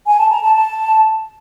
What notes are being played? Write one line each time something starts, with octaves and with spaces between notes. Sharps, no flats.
G#5
A5
A#5
A5
A5